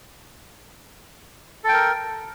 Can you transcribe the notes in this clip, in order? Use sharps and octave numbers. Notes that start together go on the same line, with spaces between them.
A4 A#4 G5